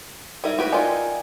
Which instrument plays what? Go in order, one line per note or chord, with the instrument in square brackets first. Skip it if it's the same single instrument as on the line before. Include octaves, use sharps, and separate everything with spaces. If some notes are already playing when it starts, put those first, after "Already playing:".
[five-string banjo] G3 [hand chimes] D#4 A#4 E5
[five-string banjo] F#4 G4 B4
[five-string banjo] D#4 F4 [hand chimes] D5 G5 G#5